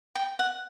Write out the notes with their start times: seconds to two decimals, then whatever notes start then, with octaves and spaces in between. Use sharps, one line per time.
0.15 G5
0.39 F#5